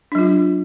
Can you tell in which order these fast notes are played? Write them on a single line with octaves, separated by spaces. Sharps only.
D4 F#3 F4